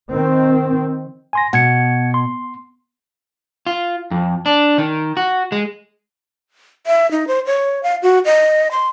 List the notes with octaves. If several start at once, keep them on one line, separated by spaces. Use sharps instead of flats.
D#3 C4
G#5 C6 A#6
B2 F#5 G#6 C#7
C6
F4
F2
D4
D#3
F#4
G#3
E5
D#4
C5
C#5
F5
F#4
D#5
C6